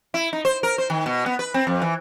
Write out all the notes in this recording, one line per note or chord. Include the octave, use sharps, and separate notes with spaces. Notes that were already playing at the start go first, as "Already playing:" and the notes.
E4
D#4
C5
A#4
C5
D#3
B2
B3
B4
C4
F2
E3